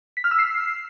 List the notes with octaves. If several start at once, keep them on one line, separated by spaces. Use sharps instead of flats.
B6
F6
E6
C7